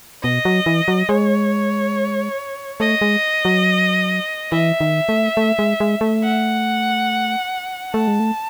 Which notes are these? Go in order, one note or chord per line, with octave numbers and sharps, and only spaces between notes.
B2 D#5
F#3
E3
F#3
G#3 C#5
A3 D#5
G#3
F#3
E3 E5
D#3
A3
A3
G#3
G#3
A3
F#5
A3 A5
G#3
A3